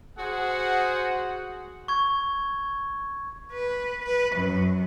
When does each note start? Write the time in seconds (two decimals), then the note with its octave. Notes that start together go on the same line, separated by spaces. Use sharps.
0.19 F#4 G#4 C5 F#5
1.88 C#6 G#6
3.52 B4
4.05 B4
4.36 F#2